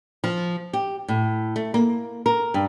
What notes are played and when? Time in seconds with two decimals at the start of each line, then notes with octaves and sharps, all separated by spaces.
0.24 F3
0.73 G4
1.08 A2
1.56 A3
1.74 A#3
2.26 A#4
2.54 G2